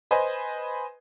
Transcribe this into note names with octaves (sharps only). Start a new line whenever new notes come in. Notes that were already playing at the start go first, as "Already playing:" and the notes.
B4 C5 D#5 G#5